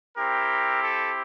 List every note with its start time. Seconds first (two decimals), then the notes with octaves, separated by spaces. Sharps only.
0.17 C4 E4 G4 A#4
0.81 A4